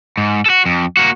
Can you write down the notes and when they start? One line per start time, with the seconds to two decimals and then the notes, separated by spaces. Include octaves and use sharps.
0.17 G#2
0.46 F#4 A4
0.66 F2
0.97 A#3 F#4